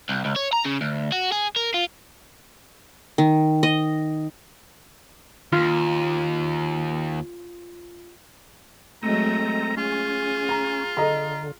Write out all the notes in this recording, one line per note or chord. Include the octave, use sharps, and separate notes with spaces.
C2
C#2
C#5
A#5
C#3
D2
F#4
G#4
A#4
F4
D#3
D#5
D#2 F4
F#3 G#3 A3 C4 A4 D#5 A#5
C#4 F4 G#4
A#5
D3 A4 D#5 A#5